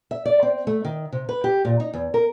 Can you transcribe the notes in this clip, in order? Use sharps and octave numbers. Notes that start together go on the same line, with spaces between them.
E5
D5
C4
A3
D#3
C3
B4
G4
A#2
D#4
E2
A#4